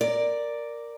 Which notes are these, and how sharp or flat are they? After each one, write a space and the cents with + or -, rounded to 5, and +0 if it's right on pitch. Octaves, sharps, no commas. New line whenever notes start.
A#4 +0 D5 +0